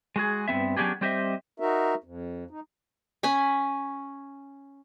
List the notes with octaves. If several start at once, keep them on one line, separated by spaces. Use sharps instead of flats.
G#3 F#4 G#4
G2 B3 C4 E5
F#3 B3 C#4 D4 G4 G#4
G3 C4 G4 C5 D#5 E5
D#4 F#4 A#4 E5
F2
D#4
C#4 G#5 B5